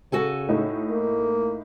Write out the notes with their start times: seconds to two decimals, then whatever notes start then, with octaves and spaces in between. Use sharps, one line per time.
0.12 C#3 F#4 A4 G#5
0.49 A2 D#4
0.90 A#3